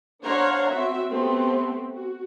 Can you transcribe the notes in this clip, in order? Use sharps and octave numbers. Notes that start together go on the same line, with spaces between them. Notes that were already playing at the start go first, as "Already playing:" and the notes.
D4 C5 C#5 F5 F#5 A#5
C4 F#4 E5
A3 B3 C4 G4
F#4